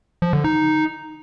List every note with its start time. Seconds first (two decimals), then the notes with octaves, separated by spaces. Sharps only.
0.22 F3
0.33 D3
0.44 D#4